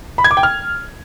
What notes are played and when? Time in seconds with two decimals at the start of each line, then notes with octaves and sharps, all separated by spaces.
0.18 B5
0.24 G#6
0.31 D6
0.37 G5
0.43 F6